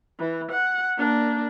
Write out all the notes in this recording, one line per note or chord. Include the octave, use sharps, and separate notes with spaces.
E3
F#5
A#3 D4